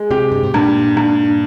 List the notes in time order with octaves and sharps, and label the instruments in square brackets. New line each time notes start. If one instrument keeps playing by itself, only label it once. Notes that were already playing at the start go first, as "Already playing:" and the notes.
Already playing: [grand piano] G#3
[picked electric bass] C3 [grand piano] G4
[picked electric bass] G2
G#2
[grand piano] G2 [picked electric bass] A#2
[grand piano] G2